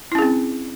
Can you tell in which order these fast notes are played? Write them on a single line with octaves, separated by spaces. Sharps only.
E4 C#4 G#4 C4